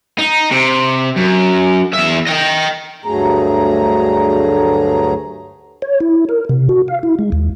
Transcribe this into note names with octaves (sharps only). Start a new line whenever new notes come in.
D#4
C3
F#2
E2 E5
D#5 G5
D2 G2 F#3 A3 G#4 A#5
C#5
E4
A#4
C3
F#4
F5
E4
G#3
D#2